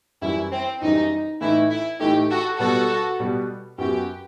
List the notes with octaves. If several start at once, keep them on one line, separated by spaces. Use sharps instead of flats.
F#2 E3 G3 E4
C4
F#2 E3 G3 D#4
A2 E3 A3 D#4 E4
E4
A2 E3 A3 D#4 G4
F#4 A4
B2 G3 B3 F#4 A4
B2 G3 B3
F#2 F#3 B3 F#4 G4